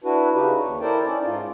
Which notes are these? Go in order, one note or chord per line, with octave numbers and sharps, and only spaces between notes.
D4 E4 F#4 B4
C#3 D#4 G4 B4
D#2 C#5
E4 A4 A#4 C5 D5 G5
C#4 D#4 D5
G#2 F4